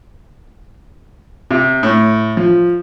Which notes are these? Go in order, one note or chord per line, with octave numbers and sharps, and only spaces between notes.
C3
A2
F3